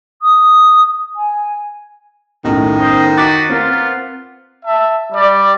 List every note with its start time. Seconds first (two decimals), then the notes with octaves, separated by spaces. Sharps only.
0.21 D#6
1.16 G#5
2.45 B1 F#2 A2 D#3
2.79 C5 D#5
3.17 D#4 F#4 D6 F#6 A6 B6
3.50 B3 C4 F4 A#4
4.64 E5 A5
5.12 G3 D5